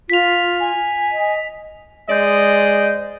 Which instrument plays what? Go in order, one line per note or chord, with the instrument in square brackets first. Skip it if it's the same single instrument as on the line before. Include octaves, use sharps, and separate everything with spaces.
[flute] F4 [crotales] B6 F7
[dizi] G#5
[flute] D#5
[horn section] G#3 C5 D5 D#5